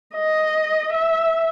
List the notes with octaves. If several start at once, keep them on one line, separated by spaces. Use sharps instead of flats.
D#5
E5